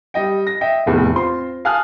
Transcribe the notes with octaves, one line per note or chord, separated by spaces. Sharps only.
G3 D#5 G5
A#6
D#5 E5 G5
F1 E2 A2
C4 F4 C6
F5 G#5 A5 D#6 F6 F#6